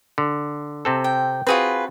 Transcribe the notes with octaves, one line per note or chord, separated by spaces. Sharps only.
D3
C3 C4 A4
G5
C4 F4 F#4 G#4 B4